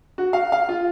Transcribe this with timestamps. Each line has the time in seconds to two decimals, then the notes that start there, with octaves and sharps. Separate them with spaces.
0.18 F#4
0.33 F5
0.52 F5
0.69 F4